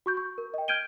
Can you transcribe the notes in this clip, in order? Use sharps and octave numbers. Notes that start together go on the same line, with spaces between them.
F#4 C#6 G6
C#6
A#4
D#5 G5
F6 G6 G#6 D7 D#7 G7